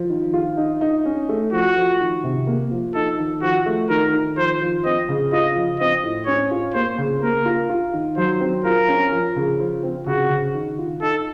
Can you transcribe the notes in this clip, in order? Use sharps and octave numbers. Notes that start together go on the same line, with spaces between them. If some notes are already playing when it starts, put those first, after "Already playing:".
Already playing: F3
D#3
F4
D#4
D#4
C#4
A3
F3 F#4
F3
D#3
C3
A#3
F3
D#4 A4
D#3
F3 F#4
A3
D#3 A#4
D#3
F3 C5
F3
C4 D#5
C#3
F4 D#5
F3
C4 D#5
A2
C#4 C#5
F4
A#3 C5
C#3
A#3 A#4
F4
F4
D#3
F#3 C5
C4
F4 A#4
C#4
F3
C#3
F3
C4
C#3 F#4
C#3
D#3
F4
D#4 A4